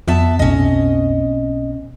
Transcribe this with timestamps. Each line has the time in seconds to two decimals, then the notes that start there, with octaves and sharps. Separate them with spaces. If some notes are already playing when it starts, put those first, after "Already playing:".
0.08 F2 B3 E5 A5
0.39 B1 C4 C#4 D#5